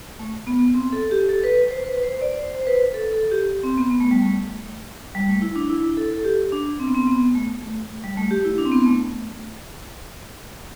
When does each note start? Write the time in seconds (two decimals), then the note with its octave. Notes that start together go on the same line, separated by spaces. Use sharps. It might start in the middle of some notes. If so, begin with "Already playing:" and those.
0.19 A3
0.47 B3
0.74 C4
0.93 A4
1.11 G4
1.29 A4
1.44 B4
1.71 C5
1.85 B4
2.03 C5
2.21 D5
2.39 C5
2.61 C5
2.67 B4
2.94 A4
3.13 A4
3.31 G4
3.63 C4
3.78 B3
3.91 B3
4.01 A3
4.11 G3
4.22 A3
5.15 G3
5.28 A3
5.42 E4
5.56 D4
5.70 E4
5.97 A4
6.10 A4
6.25 G4
6.52 D4
6.80 C4
6.88 B3
6.94 C4
7.07 B3
7.35 A3
7.62 A3
8.04 G3
8.18 A3
8.31 G4
8.45 E4
8.58 D4
8.66 C4
8.72 B3
8.86 A3